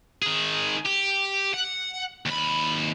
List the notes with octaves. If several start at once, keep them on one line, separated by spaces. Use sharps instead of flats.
D#3 G#4
G4
F#5
D#2 B5